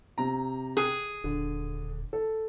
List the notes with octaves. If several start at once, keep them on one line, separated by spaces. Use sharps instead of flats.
C3 A#5
G#4
D#1 D3
A4